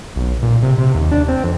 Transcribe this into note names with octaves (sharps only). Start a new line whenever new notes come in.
B1
A#2
C3
C3
D#2
D4
C4
F2